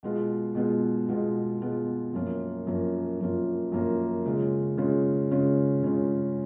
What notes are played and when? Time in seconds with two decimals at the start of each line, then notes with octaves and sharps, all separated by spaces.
0.03 B2 G#3 B3 F4
0.55 B2 G#3 B3 F4
1.09 B2 G#3 B3 F4
1.61 B2 G#3 B3 F4
2.13 F#2 F3 A#3 C#4 F4
2.67 F#2 F3 A#3 C#4 F4
3.20 F#2 F3 A#3 C#4 F4
3.72 F#2 F3 A#3 C#4 F4
4.26 C#3 G#3 C#4 F4
4.77 C#3 G#3 C#4 F4
5.31 C#3 G#3 C#4 F4
5.83 C#3 G#3 C#4 F4